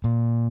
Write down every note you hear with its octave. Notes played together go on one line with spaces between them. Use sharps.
A#2